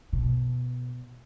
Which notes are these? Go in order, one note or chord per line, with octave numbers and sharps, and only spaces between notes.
B2